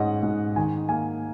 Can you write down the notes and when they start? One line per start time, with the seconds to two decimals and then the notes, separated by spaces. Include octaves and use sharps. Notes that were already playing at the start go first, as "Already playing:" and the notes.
Already playing: G#2 C#4 D#5 F#5
0.23 G#2
0.56 D#3 G#5
0.89 A#3 G#5